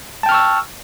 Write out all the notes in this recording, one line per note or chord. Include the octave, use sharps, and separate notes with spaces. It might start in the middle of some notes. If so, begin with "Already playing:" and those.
G5 A5 C#6 E6 F6